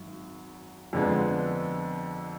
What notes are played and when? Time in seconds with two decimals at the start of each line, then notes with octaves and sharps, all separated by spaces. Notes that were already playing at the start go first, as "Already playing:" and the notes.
Already playing: G#1 F#2
0.93 F2 D3 G#3 B3